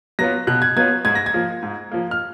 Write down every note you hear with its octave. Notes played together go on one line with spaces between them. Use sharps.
F#3 B3 F4 A#6
B2 F#6
G#6
F#3 B3 F4 G#6
G#2 G#6
A#6
G#6
F3 A#3
G#2
F3 A#3
F6